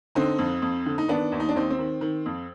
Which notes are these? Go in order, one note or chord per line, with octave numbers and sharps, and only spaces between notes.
D3 C4 D#4
F2
F2
D3
D#4
D#3 B3 D4
D#2
D#4
D4
D#2 C4 D#4
C4
D#3
D#3
F2